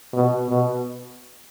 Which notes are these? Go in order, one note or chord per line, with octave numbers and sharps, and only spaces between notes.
B2
B2